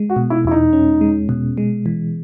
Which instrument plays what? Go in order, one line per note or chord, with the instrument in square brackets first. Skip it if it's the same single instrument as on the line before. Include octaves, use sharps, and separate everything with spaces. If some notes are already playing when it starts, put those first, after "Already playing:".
Already playing: [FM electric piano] G#3
[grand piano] F#4
[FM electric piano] B2
[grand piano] E4
[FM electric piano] E2 [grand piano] E4
[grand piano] D#4
[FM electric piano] C#4
G#3
B2
G#3
E3